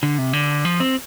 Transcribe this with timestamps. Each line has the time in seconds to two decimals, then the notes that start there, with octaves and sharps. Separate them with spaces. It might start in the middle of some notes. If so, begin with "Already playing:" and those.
0.03 D3
0.18 C3
0.33 D3
0.65 F3
0.80 C4